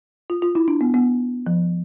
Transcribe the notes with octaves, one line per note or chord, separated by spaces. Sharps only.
F4
F4
E4
D4
B3
B3
F3